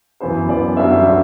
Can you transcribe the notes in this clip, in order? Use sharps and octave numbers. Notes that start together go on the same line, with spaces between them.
F#2 E3 B3 C5
F#2 E3 B3 D5
F#2 D3 G3 C4 C5 E5
D3 G3 C4